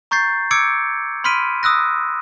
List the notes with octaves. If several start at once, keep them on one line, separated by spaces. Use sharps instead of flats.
A#5 C#6 G6 A6 C7
D6 E6 G#6 C#7 D7
B5 C6 F6 B6 D7 D#7
D#6 E6 F#6 A#6